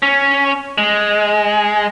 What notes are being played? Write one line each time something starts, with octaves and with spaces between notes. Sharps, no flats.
C#4
G#3